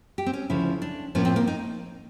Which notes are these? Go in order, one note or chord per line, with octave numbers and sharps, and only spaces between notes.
G4
C4
C#4
D2 C#3 F3 E4
D4
A2 F3 A#3 C#4
C4
A#3
D#4